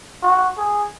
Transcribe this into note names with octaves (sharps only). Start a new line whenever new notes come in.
F#4
G#4